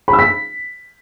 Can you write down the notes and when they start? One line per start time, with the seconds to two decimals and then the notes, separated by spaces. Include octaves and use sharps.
0.08 B5
0.13 E6
0.19 B6